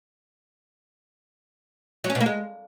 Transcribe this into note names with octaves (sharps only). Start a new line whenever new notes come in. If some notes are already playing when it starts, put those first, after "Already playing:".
F#3
C#4
B2
A#3
G#3